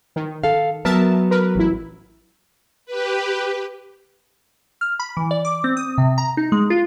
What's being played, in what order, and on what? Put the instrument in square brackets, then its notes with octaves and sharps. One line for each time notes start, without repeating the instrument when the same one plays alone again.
[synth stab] D#3
[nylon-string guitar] A4 F5
[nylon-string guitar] F#3 B3 [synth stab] A#4 E5 A5
[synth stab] A#4 B4
A1 E4
[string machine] G4 B4
[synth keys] F6
B5
E3
D5
D6
C4
D#6
C3
A#5
D#4
G#3
F4